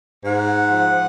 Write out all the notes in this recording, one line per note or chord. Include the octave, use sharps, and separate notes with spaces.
G#2 F#5
F3